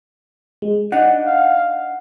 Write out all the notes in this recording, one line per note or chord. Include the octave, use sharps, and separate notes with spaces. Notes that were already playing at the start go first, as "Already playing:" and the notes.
G#3
D4 D#4 F#5
F5